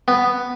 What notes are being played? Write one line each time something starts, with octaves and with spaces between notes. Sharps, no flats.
B3